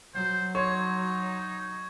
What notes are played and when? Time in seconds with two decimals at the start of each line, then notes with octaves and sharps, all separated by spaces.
0.15 F#3 C5
0.55 D#4 C#5 C6 C#6 G#6